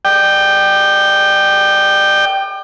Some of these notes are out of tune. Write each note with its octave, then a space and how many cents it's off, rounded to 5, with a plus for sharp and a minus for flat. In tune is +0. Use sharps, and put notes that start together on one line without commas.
D5 +35 G5 -5